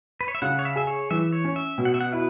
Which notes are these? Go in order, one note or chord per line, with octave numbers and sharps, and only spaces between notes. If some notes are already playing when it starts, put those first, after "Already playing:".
B4
C#5
E5
C#3 F#5
C#5
E5
G#4 E5
C#5
E3 E5
C#5
C#4
E5
B2
F#5
E5
F#5
E4 B4